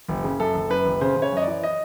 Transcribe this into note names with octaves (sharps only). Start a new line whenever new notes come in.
F#1
C#3
F#2 A4
F#1
F#2 B4
F#1
C#3 C5
C#3
C#5
F#2 D#5
E3 D5
D#5